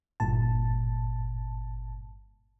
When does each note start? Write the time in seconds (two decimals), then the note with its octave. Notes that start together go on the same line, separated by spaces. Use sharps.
0.20 G1 G2 A#2 A5